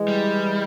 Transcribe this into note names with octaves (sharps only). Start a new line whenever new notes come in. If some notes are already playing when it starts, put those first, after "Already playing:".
Already playing: E3 G#3
G3